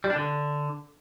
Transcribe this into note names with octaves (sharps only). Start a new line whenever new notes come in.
G3
D4
D3